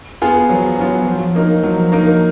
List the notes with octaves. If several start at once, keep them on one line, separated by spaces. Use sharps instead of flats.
B3 F4 G#4
F3 F#3
F#3 B3 F4 G#4
F3 F#3
A#3 D#4 A#4
F3 F#3
F3 A#3 D#4 A#4